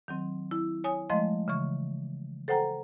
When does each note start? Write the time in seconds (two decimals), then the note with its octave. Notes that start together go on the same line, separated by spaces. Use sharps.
0.08 D#3 F#3 C4
0.51 E4
0.84 C#5 G#5 D#6
1.10 F3 G#3 A3 D#5 C6
1.48 C#3 E3 C#6
2.48 A4 C5 F#5 G5 A#5